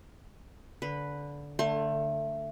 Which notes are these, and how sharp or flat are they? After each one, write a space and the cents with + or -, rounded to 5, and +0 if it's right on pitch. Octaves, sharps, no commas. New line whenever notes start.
D3 -20 B4 +0
D3 +0 A3 +20 C6 +40